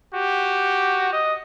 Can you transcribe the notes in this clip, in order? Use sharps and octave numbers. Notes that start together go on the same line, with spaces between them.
F#4 G4
D#5